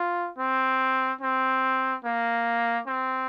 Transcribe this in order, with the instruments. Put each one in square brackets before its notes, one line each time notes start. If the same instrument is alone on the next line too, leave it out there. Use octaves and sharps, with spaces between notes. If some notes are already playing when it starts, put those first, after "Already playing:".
Already playing: [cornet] F4
C4
C4
A#3
C4